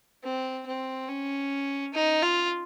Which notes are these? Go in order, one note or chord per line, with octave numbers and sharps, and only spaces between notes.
C4
C4
C#4
D#4
F4